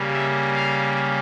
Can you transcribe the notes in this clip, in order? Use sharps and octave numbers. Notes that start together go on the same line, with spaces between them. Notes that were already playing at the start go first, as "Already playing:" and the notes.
Already playing: C#3 G3 A#3
E5
F5